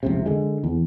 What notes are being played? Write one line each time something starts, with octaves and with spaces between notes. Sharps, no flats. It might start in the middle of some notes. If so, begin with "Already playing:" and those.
F1 C#2 C3
D3 G#3
E2